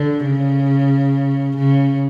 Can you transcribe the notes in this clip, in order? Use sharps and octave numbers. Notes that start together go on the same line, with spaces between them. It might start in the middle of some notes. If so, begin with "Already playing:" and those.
Already playing: D3
C#3
C#3